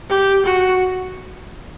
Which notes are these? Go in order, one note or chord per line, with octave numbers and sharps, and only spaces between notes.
G4
F#4